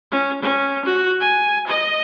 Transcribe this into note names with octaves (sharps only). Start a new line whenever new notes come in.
C#4
C#4
F#4
G#5
D#5